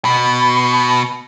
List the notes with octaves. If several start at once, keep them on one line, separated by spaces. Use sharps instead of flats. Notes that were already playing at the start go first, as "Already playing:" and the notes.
B2